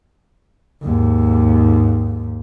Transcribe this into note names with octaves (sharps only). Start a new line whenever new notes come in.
D#2 G#2